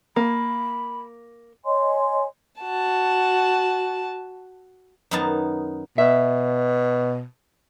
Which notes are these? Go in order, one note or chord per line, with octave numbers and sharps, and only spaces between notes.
A#3 B5
C#5 D#5 G#5 C6
F#4 A5
F#2 D#3 B3 D#4 A5
B2 E5